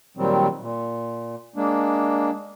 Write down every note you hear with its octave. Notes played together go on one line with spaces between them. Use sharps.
A#2 D#3 F#3 G3 C4
A#2
G#3 A#3 D4